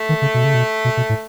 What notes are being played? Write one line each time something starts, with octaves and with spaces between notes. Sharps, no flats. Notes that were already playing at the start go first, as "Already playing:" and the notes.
Already playing: A3
D#3
C#3
B2
C#3
B2
B2
B2
A2